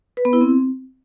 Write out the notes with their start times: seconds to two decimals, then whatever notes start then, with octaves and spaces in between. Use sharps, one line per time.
0.17 B4
0.25 B3
0.33 E4
0.41 C4